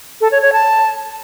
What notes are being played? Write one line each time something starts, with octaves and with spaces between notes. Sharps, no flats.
A4
C#5
C#5
A5